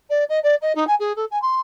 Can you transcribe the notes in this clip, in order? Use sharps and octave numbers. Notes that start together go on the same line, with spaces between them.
D5
D#5
D5
D#5
D#4
G#5
G#4
A4
G#5
C6